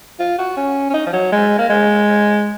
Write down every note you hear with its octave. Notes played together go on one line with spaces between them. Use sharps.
F4
F#4
C#4
C#4
D#4
F3
F#3
G#3
A#3
G#3